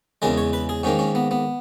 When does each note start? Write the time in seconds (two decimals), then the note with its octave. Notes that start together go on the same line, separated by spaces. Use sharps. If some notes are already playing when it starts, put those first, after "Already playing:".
0.22 E2 C#3 G#3 A#4
0.38 C#5
0.53 B4
0.69 G#4
0.83 G#2 D#3 A#3 C#4
0.99 C#4
1.15 B3
1.31 B3